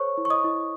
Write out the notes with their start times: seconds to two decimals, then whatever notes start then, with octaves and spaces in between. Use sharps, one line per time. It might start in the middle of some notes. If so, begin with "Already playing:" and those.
Already playing: A4 C5 C#5 C#6
0.17 E4
0.25 C#6
0.30 D#5 D#6
0.44 E4